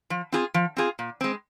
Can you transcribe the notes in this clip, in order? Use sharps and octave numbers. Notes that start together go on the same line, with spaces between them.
F3
C4 F4 G#4
F3
C4 F4 G#4
A#2
G#3 C4